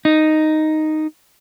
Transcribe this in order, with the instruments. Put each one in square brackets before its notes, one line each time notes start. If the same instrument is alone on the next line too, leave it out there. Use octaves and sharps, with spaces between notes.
[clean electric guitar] D#4